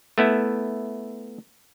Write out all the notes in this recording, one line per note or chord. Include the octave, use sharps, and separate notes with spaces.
A3 B3 E4